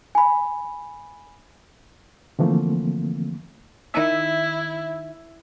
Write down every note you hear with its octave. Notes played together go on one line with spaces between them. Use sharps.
G#5 B5
D3 E3 F3 A3 A#3 C4
D#3 E4 E5